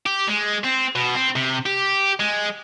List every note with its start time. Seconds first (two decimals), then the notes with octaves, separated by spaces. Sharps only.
0.06 G4
0.28 G#3
0.64 C4
0.96 B2
1.15 C4
1.36 C3
1.66 G4
2.20 G#3